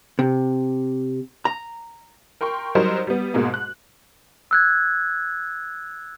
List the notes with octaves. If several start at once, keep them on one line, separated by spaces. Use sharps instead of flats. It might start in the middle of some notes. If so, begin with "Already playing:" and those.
C3
A#5
A#4 G5 C6 C#6
F#3 G3 D#4 A#4 C5
G3 B3
G#2 B2 G#3 A#3
F#6
E6 F#6 G#6